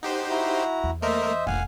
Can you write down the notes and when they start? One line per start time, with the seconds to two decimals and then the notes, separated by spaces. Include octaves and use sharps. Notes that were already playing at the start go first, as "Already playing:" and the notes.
0.03 D#4 G4 C5 F#5
0.30 E4 F#4 A#5
0.83 E2
1.02 A3 A#3 A#4 C5 D#5 E5
1.47 F1 A#1 C4 F5 F#5 G#5